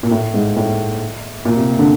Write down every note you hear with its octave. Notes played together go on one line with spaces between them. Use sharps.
A#2
A2
G#2
A2
A#2
C3
D3